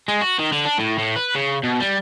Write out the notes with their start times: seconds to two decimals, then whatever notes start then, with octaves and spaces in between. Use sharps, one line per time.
0.08 G#3
0.22 F#4
0.39 D#3
0.53 D3
0.66 D4
0.79 A2
0.99 A2
1.16 B4
1.35 C#3
1.64 B2
1.80 G3